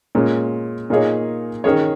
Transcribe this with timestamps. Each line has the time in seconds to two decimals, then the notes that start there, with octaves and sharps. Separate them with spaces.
0.15 A#2 G#3 C#4
0.90 A#2 A#3 D#4 G#4 C#5
1.64 D#3 C#4 G#4 C#5